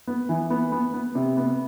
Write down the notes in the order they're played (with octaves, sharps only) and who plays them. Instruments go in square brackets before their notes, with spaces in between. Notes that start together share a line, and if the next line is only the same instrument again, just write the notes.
[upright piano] B3
E3
B3
B3
B3
C3
B3